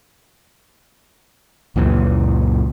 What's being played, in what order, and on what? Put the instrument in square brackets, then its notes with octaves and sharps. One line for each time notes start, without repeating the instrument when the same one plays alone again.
[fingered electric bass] C#2 F#2 A#2 E3